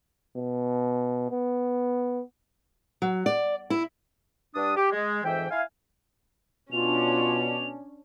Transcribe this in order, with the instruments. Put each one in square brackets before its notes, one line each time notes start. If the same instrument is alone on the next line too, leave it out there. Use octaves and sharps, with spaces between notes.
[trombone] B2
B3
[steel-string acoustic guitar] F#3
D5
E4
[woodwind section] G2 D4 D#6
G4
G#3
F2 G#2 E3 E5 G5
E4 F5 G#5
[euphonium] B2 [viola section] C#4 D4 [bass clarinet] F4 [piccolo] F7